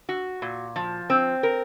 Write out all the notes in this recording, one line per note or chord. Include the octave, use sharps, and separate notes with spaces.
F#4
A#2
F3
C4
A#4